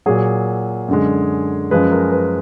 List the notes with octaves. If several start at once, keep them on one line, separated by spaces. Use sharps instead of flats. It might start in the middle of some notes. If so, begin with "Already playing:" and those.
A#2 F#3 G#4
F#2 D3 G#3
F#2 F3 G#3 B4
A#4
B4